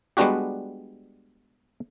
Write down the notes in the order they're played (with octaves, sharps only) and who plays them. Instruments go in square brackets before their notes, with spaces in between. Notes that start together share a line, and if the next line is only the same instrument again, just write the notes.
[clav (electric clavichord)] G3 G#3 B3 D4 F#4 G4